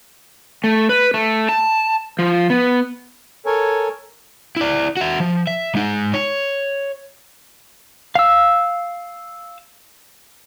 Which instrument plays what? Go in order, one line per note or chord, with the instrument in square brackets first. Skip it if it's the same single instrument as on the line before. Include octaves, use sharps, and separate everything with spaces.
[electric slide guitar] A3
B4
A3
A5
F3
B3
[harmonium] A4 A#4 C#5 G#5
[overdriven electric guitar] E4 D5
F#4 E5
F3
E5
G#3 D#4
C#5
[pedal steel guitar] F5 E6